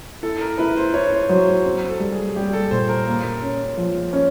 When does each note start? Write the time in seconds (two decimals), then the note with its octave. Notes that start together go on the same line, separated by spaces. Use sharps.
0.23 E4 A4
0.41 A#4
0.58 E4 B4
0.77 C5
0.94 E4 C#5
1.12 C5
1.29 F#3 C5
1.47 C5
1.65 C4
1.89 A4
2.00 G3
2.12 G#4
2.36 G3 G4
2.53 A4
2.71 A#2 C5
2.89 A#4
3.07 A#3
3.42 C#4
3.77 F3
4.13 C#4